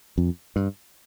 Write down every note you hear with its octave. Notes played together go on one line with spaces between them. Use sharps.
F2
G2